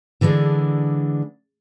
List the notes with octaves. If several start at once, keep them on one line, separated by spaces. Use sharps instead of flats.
D3 E3 G#3 C4 D4